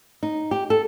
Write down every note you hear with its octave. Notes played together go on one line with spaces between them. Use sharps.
D#4
G4
A4